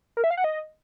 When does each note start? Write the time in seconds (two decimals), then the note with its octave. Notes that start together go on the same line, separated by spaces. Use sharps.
0.17 A#4
0.24 E5
0.31 F5
0.37 F#5
0.44 D#5